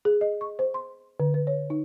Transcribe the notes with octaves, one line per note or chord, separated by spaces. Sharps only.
G#4
D#5
C#6
C5
C6
D3
B4
C#5
D#4